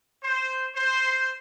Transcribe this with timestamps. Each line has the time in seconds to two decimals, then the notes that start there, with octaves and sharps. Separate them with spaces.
0.23 C5
0.75 C5